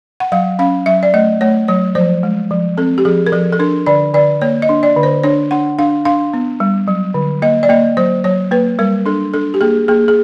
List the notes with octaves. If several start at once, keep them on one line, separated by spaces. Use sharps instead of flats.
F#5
F#3 F5
C#4 F5
F#3 E5
D5
A3 D#5
A3 C#5
F#3 C#5
F3 C5
G#3
F3
C4 A4
G4
F3 G#4
A#4
F3 A4
A4
D4 A#4
D3 D5
D3 D5
A#3 C#5
D#5
D4
D5
D3
C5
D4 C#5
D4 F#5
D4 F5
D4 F5
B3
G3
F#3
D3
A#3 D#5
D5
A#3 D#5
F#3 C5
F#3 C#5
A#3 B4
G3 A#4
D4 A4
D4 A4
G4
A#3 G#4
A#3 G#4
G#4